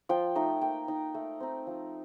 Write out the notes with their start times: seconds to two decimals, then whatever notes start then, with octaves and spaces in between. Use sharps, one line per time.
0.09 F3 G5
0.35 A3 D#4
0.61 A#3 G5
0.88 D#4
1.15 A3
1.40 C4 D#4
1.67 F3